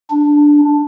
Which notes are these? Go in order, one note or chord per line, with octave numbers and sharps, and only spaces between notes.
D4